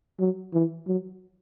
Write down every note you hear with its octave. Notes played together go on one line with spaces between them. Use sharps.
F#3
E3
F#3